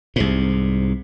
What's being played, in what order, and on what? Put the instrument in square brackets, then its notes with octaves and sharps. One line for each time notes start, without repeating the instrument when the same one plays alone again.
[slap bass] C2 G#2